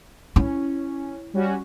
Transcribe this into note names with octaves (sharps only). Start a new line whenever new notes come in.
C#4 E4
G3 C#4 F#4